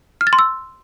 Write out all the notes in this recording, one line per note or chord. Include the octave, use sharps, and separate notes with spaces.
F6
A6
C6
E6